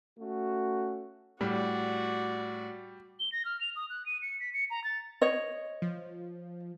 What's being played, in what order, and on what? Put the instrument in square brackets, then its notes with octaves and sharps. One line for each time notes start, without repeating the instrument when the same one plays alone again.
[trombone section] A3 C#4 F#4
[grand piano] A2 [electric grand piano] G3 [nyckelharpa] F#4 D5
[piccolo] G7
A#6
F6
F7
D#6
F#6
D#7
C#7
B6
C#7
A#5
A6
[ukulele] C#5 D#5
[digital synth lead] F3